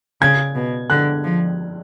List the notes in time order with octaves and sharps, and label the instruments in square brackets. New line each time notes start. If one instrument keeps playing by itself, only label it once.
[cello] C#3 [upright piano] G#6
[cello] B2
[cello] D3 [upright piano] F#6
[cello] F3